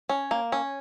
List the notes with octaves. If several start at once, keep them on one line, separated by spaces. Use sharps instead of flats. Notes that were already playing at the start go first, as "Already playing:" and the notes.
C#4
A#3
C#4